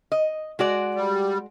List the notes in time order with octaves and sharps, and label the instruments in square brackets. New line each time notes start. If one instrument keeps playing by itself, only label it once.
[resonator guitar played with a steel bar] D#5
G#3 F#4 D5
[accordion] G3